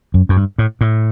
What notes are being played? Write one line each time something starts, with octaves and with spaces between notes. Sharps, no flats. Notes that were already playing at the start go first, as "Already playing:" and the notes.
F#2
F#2
G2
A2
A2